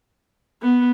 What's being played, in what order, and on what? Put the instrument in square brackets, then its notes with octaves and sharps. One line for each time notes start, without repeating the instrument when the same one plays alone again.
[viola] B3